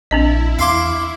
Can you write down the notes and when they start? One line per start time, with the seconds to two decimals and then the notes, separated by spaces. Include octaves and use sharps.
0.11 A#1 C4 D4 E4 D#5
0.59 E2 F5 C6 D6